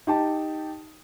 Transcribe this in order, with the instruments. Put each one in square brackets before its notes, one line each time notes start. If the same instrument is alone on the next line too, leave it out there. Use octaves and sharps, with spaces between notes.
[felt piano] D#4 G4 A5